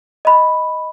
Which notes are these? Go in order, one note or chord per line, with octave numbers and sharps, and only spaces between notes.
D#5 B5